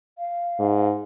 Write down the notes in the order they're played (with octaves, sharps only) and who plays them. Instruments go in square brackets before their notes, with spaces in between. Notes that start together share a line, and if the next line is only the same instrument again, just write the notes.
[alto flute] F5
[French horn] G#2